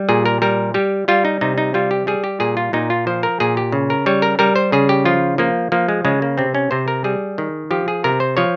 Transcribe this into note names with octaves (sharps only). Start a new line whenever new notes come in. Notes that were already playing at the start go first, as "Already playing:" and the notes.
Already playing: G3
A#2 G#4
A#4
G3 A#4
G3 G4
G3 F4
D#4
C3 D#4
D#4
G3 F4
G4
G3 G#4
G4
A#2 G#4
F4
A#2 D#4
F4
F3 C5
A#4
A#2 G#4
G4
C#3
A#4
G3 C#5
A#4
G3 A#4
C5
C#3 G#4
G4
F3 F4
F3 A#3
F3 A#3
G#3
C#3 G#3
A#3
C3 C4
C#4
C3 C5
A#4
G3 G#4
D#3
F3 G4
G#4
C3 A#4
C5
F3 C#5